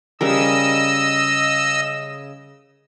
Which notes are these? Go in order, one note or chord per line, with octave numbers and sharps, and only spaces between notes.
C#3 G3 A#4 D#5 E6